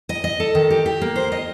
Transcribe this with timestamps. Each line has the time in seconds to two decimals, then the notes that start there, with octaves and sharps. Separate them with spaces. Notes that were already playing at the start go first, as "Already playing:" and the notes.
0.09 D#5
0.24 D#5
0.40 A4
0.55 D#3
0.70 G4
0.86 G4
1.01 A#3
1.16 C5
1.32 D#5